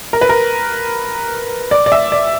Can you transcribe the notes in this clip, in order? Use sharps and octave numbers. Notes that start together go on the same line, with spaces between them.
A#4
B4
A#4
D5
D5
E5
D5